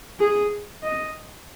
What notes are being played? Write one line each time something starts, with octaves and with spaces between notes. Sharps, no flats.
G#4
D#5